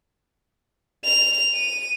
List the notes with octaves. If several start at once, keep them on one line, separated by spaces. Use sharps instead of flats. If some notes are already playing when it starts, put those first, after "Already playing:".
F7
D#7